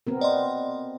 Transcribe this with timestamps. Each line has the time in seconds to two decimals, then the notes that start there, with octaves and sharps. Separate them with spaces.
0.07 B3 C4 A#4
0.21 D5 D#5 C6